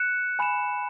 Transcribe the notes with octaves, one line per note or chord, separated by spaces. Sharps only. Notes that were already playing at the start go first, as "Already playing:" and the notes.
Already playing: F#6 C#7 E7
G#5 B5 F#6 E7